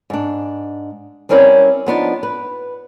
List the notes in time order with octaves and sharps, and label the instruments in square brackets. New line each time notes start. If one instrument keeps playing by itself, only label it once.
[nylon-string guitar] G#2 D4
G3 C4 C#4 E4 A#4 D5
F3 B3 D4 D#4
B4